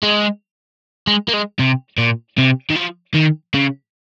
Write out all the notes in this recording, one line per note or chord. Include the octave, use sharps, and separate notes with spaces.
G#3
G#3
A#3
G#3
C3
A#2
C3
D#3
F3
D#3
C#3